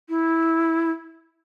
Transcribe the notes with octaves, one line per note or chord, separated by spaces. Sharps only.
E4